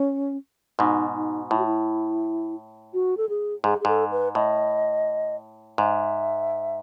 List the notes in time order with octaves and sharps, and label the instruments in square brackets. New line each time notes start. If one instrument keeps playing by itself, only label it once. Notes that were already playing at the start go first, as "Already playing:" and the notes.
Already playing: [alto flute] C#4
[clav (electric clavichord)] G#2 B2 [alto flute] D#4
[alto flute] D#4
[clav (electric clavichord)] A2 [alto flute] E4
[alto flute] F#4
E4
F#4
A4
G#4
[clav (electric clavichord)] G#2 [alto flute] G#4
[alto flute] G#4
[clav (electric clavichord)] G#2 [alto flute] A4
[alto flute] B4
[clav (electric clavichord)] A2 [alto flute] D#5
[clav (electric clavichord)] G#2 [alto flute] E5